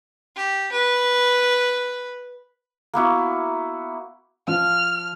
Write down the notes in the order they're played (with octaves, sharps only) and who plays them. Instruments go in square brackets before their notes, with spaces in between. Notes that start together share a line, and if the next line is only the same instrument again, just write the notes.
[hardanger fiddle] G4
B4
[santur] A#3 B3 E4 F#4
[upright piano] F3 [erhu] F6